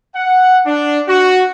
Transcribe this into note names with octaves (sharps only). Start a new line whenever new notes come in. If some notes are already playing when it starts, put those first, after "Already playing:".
F#5
D4
F#4